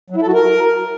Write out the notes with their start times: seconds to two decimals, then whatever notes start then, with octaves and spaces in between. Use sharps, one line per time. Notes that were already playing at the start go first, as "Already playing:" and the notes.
0.10 F#3
0.16 E4
0.22 A4
0.28 F#4
0.34 A#4